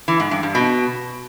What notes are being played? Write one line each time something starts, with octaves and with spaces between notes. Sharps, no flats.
E3
G#2
G2
G2
B2